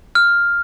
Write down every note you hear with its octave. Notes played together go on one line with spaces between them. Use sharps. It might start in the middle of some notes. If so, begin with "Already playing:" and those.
F6